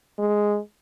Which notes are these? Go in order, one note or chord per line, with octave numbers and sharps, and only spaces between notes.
G#3